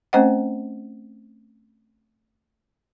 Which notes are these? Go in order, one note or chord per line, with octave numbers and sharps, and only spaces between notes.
A3 C4 C#4 C5 D#5 F#5